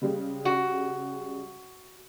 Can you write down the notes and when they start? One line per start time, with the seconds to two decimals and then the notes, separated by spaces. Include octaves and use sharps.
0.01 C#3 G3 G#3
0.45 F#4